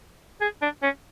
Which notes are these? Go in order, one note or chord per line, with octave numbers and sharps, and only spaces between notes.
G#4
D4
C#4